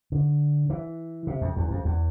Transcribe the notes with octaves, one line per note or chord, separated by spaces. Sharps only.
D3
E3
C3
F2
E2
F2
E2